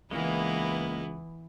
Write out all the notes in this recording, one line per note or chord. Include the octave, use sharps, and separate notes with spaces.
C#2 E3 G#3 A#3 B3 E4